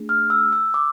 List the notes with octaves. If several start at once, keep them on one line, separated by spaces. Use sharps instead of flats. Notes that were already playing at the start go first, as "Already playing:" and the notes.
Already playing: A3 D4 G#4
F6
E6
E6
D6